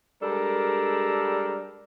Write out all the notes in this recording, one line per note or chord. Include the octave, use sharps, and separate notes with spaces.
G3 G#3 D4 A4 A#4